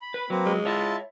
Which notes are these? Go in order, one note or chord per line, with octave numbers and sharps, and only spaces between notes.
B5
B4
F#3 A#3 C4 B4
G#3
E4 F4 C#5 E5 A5